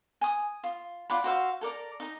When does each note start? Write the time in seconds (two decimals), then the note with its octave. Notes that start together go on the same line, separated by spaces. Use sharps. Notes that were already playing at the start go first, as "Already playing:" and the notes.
0.21 G#5 D#6
0.63 F4
1.10 F4 D5 F#5 B5
1.24 F#4 C5 E5 F5
1.61 A4 A#4 D5 A#5
2.00 D#4 A#5